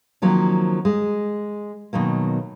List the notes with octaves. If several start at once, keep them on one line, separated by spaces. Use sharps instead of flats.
D#3 F3 F#3 A#3 C4
G#3
B2 D#3 F#3 A#3